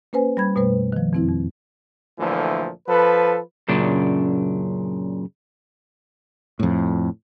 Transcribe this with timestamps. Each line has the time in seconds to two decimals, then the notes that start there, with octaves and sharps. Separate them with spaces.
0.13 A#3 C#4 B4 C5 G#5
0.37 G3 B5 G#6
0.55 F#2 B2 G3 A3 B4 C5
0.92 D#3 F3
1.13 F2 C4 E4
1.29 F2
2.19 D2 A#2 E3 F3 A3
2.88 F3 A4 B4
3.68 F#2 A#2 C#3 D4
6.59 F2 A2